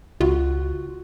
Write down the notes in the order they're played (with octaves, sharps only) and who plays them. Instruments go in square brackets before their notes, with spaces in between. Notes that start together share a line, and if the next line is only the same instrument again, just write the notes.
[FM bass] C#2 [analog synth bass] F4 [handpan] F#4